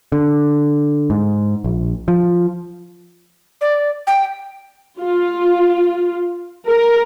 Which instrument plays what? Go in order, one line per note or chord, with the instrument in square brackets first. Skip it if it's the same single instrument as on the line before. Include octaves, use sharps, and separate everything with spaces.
[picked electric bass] D3
G#2
A#1
F3
[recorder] D5
G5
[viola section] F4
A#4